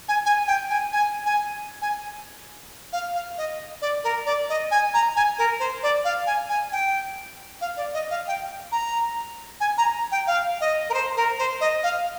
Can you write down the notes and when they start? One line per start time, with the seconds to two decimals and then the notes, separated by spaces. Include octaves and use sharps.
0.08 G#5
0.25 G#5
0.47 G5
0.70 G#5
0.92 G#5
1.26 G#5
1.82 G#5
2.93 F5
3.15 F5
3.38 D#5
3.82 D5
4.04 A#4
4.26 D5
4.49 D#5
4.71 G#5
4.94 A#5
5.16 G#5
5.38 A#4
5.60 C5
5.83 D5
6.05 F5
6.27 G#5
6.49 G#5
6.72 G5
7.61 F5
7.77 D5
7.94 D#5
8.10 F5
8.28 G5
8.72 A#5
9.60 G#5
9.78 A#5
10.12 G5
10.27 F5
10.61 D#5
10.90 A#4
10.94 C5
11.17 A#4
11.39 C5
11.61 D#5
11.83 F5